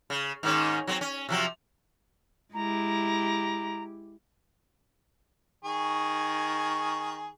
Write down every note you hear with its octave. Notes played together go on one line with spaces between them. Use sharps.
C#3
G#2 D#3 C#4
F#3 B3 C4
C#4
C3 F3 F#3
G#3 E4 G4 A#5
D#3 G#4 C#6